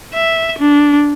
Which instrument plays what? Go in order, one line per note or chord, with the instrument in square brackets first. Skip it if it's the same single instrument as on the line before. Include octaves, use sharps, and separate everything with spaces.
[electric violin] E5
D4